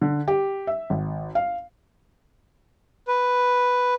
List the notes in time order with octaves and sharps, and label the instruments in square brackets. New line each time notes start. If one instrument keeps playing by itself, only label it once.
[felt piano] D3
G4
E5
G#1
F5
[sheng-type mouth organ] B4